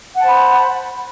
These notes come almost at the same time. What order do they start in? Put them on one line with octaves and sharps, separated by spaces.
F#5 A5 C5 B5